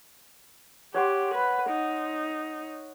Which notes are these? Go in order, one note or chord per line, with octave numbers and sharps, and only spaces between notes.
G4 C#5 F#5 C6
B4
D#4